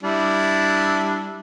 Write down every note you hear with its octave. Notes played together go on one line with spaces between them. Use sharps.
G3 D4 E4